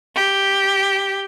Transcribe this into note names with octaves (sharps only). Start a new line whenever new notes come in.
G4